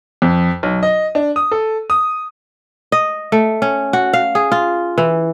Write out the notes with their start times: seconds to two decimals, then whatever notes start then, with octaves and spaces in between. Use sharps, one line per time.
0.22 F2
0.63 B1
0.83 D#5
1.15 D4
1.36 D#6
1.52 A4
1.90 D#6
2.92 D#5
3.32 A3
3.62 C#4
3.93 F#4
4.13 F5
4.35 G#4
4.52 F4
4.98 E3